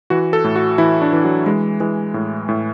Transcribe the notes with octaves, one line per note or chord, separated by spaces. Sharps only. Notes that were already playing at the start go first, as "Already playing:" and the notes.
E3 F#4
A4
A2
F#4
E3 E4
D4
E3
F#3
E3 G#3
E3 G#3
A2
A2